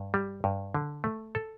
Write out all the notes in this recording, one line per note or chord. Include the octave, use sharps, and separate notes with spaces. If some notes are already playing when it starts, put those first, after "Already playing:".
Already playing: G2
G3
G2
D3
A3
A4